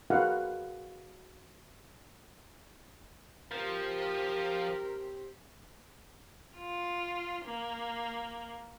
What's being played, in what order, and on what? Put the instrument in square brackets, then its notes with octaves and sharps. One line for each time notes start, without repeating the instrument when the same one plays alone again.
[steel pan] F#4 G#4 A#4 B4 F5 F#5
[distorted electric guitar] F3 [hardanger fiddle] C4 G4 [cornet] A#4
[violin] F4
A#3